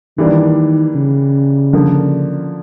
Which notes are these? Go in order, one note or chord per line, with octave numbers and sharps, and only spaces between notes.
D#3 E3 G3 A#3 D4
C#3
D3 F3 A#3